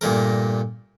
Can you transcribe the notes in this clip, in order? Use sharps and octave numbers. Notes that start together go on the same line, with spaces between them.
G2 A#2 A3 A#4